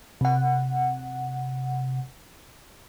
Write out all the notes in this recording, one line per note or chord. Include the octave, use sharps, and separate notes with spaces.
C3 F#5